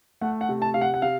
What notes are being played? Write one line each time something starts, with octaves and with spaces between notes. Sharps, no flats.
A3 F#5
F#5
C3
A5
C3 F5
F#5
F#5
C3 F5